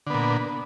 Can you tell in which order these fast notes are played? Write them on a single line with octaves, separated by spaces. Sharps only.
D3 B3 A#2